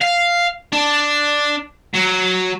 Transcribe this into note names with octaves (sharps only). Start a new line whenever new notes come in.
F5
D4
F#3